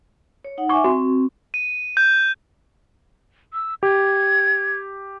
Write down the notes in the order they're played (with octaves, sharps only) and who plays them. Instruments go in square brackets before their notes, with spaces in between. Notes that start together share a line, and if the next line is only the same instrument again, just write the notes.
[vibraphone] C#5
D#4 F#5
[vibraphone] E5 G#5 D6 [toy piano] C#6
[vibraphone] C4 [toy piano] F#4
[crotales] D#7
G6
[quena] E6
[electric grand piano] G4 [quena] G#6